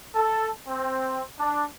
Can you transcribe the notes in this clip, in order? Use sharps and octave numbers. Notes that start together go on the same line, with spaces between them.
A4
C4
D4